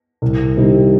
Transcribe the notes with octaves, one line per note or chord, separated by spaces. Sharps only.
C2
C3 D#3 G3